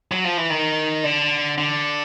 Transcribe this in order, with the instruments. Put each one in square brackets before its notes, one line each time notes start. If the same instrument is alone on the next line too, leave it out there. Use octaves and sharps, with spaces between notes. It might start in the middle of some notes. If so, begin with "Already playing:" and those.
[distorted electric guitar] F#3
F3
E3
D#3
D3
D3